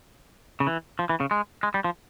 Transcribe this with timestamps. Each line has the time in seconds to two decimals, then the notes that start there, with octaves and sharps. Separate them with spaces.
0.60 C#3
0.67 E3
0.99 F3
1.09 E3
1.20 C#3
1.31 G#3
1.63 G#3
1.74 G3
1.84 F3